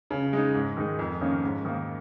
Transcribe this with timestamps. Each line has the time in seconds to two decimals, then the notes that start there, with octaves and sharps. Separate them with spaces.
0.11 C#3
0.33 G#3 D#4
0.55 G#2
0.77 D#3 G#3 D#4
0.99 F2
1.21 D#3 A#3 C#4
1.43 G#2
1.65 D#3 A#3